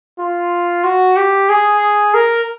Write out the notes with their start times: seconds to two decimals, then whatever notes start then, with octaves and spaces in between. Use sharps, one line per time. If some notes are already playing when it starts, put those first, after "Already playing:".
0.19 F4
0.84 F#4
1.17 G4
1.50 G#4
2.14 A#4